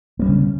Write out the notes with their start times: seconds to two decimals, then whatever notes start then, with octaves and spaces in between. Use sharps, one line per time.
0.19 A#3
0.22 G3
0.26 C#4
0.29 C#3